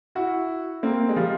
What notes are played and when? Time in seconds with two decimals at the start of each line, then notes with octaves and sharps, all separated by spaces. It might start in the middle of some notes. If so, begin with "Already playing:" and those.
0.15 E4 F#4
0.83 A#3 C4
1.09 G#3
1.16 F3 G3